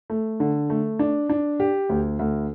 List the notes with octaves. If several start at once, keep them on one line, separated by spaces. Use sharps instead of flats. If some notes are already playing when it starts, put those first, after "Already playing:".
A3
D3
A3
D4
D4
G4
D2
D2